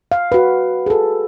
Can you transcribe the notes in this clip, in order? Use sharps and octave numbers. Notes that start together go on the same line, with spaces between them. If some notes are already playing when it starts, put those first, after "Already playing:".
F5
F#4 B4
G#4 A4